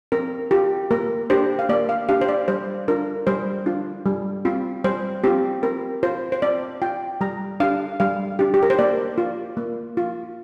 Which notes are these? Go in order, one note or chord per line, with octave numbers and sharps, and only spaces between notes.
C4 A#4
F4 G4
A#3 A#4
D4 G4 C5
F5
A#3 D5
F5
D4 G4 F5
C5
D5
G3 C5
D4 F4 A#4
G3 C5
D4 F4
G3
C4 F4
G3 C5
C4 F4 G4
C4 A#4
F4 C5
C5
C4 D5
F4 G5
G3 A#5
D4 G4 F5
G3 F5
D4 G4
G4
A#4
C5
A#3 D5
F4
A#3
F4